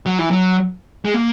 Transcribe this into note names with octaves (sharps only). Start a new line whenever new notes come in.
F#3
E3
F#3
G#3
A#3